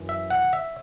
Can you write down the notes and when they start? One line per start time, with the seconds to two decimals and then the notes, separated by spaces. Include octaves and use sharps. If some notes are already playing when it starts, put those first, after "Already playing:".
Already playing: F#2 E3
0.09 E5
0.30 F#5
0.53 E5